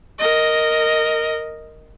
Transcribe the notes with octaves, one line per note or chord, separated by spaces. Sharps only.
A#4 D#5